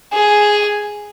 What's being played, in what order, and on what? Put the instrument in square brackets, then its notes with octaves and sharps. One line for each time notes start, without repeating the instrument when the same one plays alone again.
[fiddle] G#4